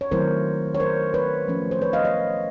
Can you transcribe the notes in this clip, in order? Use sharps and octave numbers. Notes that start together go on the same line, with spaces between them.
C#5
D#3 F#3 A3 C4 E4 A#4 C5
C#5
A#4 C5
B4 C#5
F3 A3 C#4
C5
B4 C#5
D#5 F5
C#5 D#5